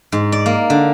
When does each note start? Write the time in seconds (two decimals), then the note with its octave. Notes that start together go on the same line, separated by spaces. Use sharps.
0.12 G#2
0.32 D5
0.46 A#3
0.70 D3